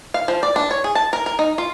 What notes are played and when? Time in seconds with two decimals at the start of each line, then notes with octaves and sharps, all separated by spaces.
0.14 F5
0.28 F3
0.43 D5
0.56 D4
0.71 C#5
0.84 G#4
0.95 A5
1.13 A#4
1.26 A#4
1.39 D#4
1.58 F4